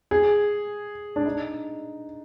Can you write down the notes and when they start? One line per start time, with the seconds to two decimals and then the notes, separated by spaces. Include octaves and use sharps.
0.11 G#4
1.16 D4
1.25 D#4